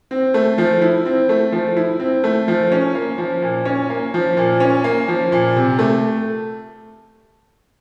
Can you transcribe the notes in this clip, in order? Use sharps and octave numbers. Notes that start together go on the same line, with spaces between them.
C4
A3
F3
E4
C4
A3
F3
E4
C4
A3
F3
C#4
A#3
F3
A#2
C#4
A#3
F3
A#2
C#4
A#3
F3
A#2
C3
A3